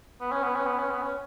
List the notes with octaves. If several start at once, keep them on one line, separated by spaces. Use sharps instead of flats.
B3
C#4
B3
C#4
B3
C#4
B3
C#4